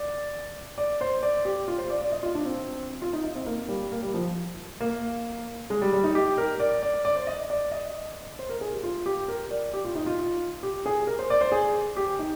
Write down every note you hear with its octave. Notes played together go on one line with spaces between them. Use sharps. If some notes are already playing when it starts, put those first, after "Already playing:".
Already playing: D5
D5
C5
D5
G4
F4
C5
D5
D5
D#5
F4
D4
C4
F4
D#4
D#4
C4
A#3
G3
A#3
G3
F3
A#3
G#3
G3
G3
D#4
G4
A#4
D5
D5
D5
C5
D#5
D5
D#5
C5
A#4
G#4
G4
F4
G4
A#4
D5
G4
F4
D#4
F4
G4
G#4
A#4
C5
D5
C5
G#4
G4
D#4